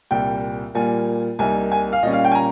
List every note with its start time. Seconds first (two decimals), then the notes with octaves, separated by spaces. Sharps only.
0.11 C2 A#2 G3 G5
0.75 A#2 G3 A#3 F4 G#5
1.39 C2 C3 G3 A#3 D#4 G#5
1.72 G#5
1.93 F5
2.03 A#2 G3 C#4 D#5
2.13 F5
2.25 G5
2.32 G#5
2.35 A#5